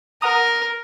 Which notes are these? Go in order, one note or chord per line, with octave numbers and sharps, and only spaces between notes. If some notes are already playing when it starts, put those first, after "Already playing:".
A#4 F#5 A#5 D#6